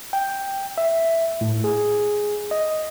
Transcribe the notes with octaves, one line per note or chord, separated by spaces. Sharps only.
G5
E5
A2
G#4
D#5